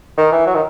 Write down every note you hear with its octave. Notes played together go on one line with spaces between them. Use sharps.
D#3
E3
F#3
D#3